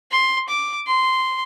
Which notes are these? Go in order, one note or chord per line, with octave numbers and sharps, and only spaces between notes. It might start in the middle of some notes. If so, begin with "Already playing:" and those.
C6
D6
C6